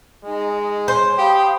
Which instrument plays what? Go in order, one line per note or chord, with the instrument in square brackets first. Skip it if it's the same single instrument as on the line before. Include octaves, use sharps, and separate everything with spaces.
[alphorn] G#3 [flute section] D#4 D#5 G#5
[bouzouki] C5 [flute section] C#5 G#5 C6
[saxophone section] G4 [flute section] F5 B5 D#6